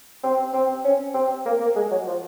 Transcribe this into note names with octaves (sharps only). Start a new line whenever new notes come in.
C4
C4
C#4
C4
A#3
A#3
G#3
F#3
F3